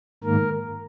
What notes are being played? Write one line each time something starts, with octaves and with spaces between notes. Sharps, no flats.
G#2 D#3 A#3 A#4